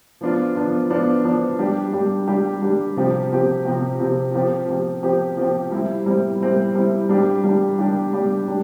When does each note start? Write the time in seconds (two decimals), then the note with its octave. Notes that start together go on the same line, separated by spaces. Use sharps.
0.21 F3 B3 D4 F4
0.55 F3 B3 D4 F4
0.90 F3 B3 D4 F4
1.24 F3 B3 D4 F4
1.59 G3 D4 G4
1.93 G3 D4 G4
2.28 G3 D4 G4
2.62 G3 D4 G4
2.96 C3 F3 C4 G4
3.31 C3 F3 C4 G4
3.65 C3 F3 C4 G4
3.99 C3 F3 C4 G4
4.34 F3 C4 G4
4.68 F3 C4 G4
5.03 F3 C4 G4
5.37 F3 C4 G4
5.72 G3 C4 E4
6.06 G3 C4 E4
6.41 G3 C4 E4
6.75 G3 C4 E4
7.09 G3 D4 G4
7.44 G3 D4 G4
7.79 G3 D4 G4
8.13 G3 D4 G4
8.48 G3 D4